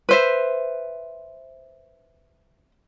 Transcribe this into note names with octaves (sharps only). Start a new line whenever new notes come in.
B4 C5 E5